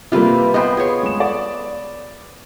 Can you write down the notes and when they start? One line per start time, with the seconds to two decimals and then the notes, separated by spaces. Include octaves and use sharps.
0.12 C3 G3 A#3 F4 G4 B4
0.54 B3 B4 C5 D#5 G5 B5
0.77 G#4 C#5
1.03 G#3 E7
1.20 D5